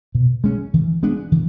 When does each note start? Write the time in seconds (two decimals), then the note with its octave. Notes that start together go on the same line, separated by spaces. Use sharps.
0.15 B2
0.44 G#3 C#4
0.74 E3
1.03 G#3 B3 D4
1.32 E3